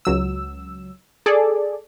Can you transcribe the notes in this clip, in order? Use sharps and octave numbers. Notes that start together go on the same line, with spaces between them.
C#2 F#3 E6
G#4 A4 D5